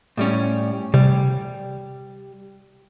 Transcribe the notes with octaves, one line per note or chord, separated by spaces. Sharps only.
A2 G3 C#4
C3 G3